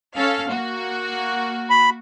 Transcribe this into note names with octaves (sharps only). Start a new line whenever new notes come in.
C#4 A4 F5
A#3 F#4
B5